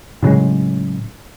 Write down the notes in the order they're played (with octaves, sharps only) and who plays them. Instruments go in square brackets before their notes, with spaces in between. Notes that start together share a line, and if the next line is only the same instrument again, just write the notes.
[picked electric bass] A2 C#3 F#3 G#3